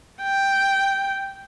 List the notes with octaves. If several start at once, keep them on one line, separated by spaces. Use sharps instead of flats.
G5